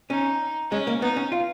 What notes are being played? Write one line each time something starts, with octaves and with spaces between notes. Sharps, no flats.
C#4 D#4
G#3 C#4
A#3
B3 D#4
C#4
F4